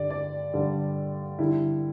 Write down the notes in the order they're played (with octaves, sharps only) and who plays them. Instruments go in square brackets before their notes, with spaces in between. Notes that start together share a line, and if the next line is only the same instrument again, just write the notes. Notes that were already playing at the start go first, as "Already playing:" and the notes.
Already playing: [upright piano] G2 D3 G3 D5
D5
G2 D3 G3
D3 G3 E4